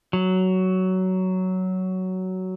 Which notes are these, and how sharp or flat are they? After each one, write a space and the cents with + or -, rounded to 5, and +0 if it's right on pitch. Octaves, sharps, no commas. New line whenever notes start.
F#3 +10